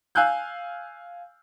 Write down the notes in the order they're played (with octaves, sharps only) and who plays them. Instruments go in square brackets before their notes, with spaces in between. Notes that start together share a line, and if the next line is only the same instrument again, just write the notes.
[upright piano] F5 G#5 E6 F#6 G6